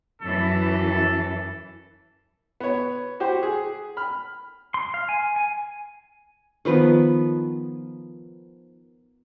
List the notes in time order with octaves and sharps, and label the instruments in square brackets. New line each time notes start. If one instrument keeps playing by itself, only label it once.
[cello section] F#2 E3 [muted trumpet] A4
[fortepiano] B3 C#5
F#4 G4 C5
G#4
B5 F6
[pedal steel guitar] C6
F5
G#5
G#5
[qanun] D#3 F3 B3 B4